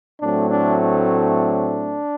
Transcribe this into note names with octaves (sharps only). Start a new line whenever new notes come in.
A2 F#3 A3 C4 D4
D4
D4